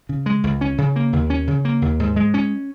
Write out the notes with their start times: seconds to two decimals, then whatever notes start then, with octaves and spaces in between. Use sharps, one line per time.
0.09 C#3
0.26 G#3
0.44 C#2
0.61 C#4
0.78 C#3
0.96 A#3
1.13 D#2
1.30 C#4
1.47 C#3
1.65 A#3
1.82 D#2
2.00 G#2
2.16 G#3
2.34 C#4